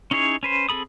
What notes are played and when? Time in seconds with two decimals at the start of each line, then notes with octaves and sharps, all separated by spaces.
0.11 C#4 D#4 E4 G#4 C#5
0.43 C#4 B4 C5
0.69 C4 G#4 A4 B5 D#6